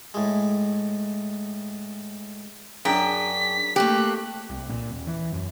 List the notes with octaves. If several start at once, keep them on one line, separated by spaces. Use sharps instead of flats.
A2 G#3
F#2 D4 G#4 G5 B6
A3 A#3 C4 G4 F#6
C2
A#2
D#1
E3
F#2